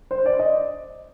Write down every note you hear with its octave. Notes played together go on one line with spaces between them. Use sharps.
C5
D5
D#5